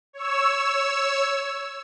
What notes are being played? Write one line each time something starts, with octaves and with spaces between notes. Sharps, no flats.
C#5 E6